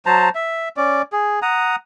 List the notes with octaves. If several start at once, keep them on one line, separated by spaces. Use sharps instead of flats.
F#3 C5 A5 A#5
E5
C#4 D5
G#4
F#5 A#5 D#6